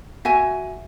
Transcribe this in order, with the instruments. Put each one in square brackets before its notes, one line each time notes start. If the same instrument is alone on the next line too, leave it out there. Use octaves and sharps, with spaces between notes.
[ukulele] F#4 E5 G#5